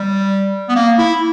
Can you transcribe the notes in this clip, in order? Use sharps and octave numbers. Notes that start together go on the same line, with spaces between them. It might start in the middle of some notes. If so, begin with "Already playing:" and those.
Already playing: G3
B3
A#3
E4